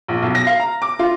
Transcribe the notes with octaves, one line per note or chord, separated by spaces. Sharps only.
A#1
B1
A#6
F5
A#5
D6
F4